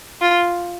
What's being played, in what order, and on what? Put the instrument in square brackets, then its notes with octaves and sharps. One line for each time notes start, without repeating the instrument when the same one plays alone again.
[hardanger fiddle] F4